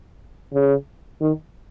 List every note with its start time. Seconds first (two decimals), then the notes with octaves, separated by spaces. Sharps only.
0.54 C#3
1.21 D#3